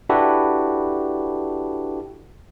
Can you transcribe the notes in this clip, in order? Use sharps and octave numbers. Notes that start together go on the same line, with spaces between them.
D4 E4 F#4 G4 A4 B4